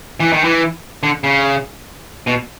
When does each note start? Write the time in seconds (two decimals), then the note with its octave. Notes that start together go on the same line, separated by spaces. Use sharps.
0.20 E3
0.33 D#3
0.44 E3
1.03 D3
1.24 C#3
2.27 B2